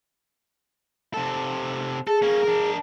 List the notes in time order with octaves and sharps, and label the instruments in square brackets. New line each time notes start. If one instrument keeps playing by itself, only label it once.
[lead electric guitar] C3 A4
[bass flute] G#4 [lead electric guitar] A4
[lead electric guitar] A#3 C#4
D4 A#4